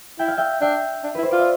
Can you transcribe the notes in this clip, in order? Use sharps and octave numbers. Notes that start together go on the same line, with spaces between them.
E4 G5
F5
E5 G5
D4 E5 G5
D4
E4 B4
C5
F4 D5
E5